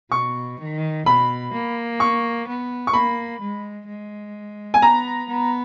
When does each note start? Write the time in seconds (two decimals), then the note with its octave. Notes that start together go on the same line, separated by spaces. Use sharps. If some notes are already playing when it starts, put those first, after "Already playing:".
0.11 B2 C#6
0.59 D#3
1.06 B2 B5
1.53 A#3
2.00 C#6
2.47 B3
2.87 C#6
2.93 A#3 B5
3.41 G#3
3.88 G#3
4.74 G#5
4.82 B3 A#5
5.29 B3